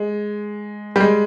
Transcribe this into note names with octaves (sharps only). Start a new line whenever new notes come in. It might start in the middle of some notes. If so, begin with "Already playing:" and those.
Already playing: G#3
G3
G#3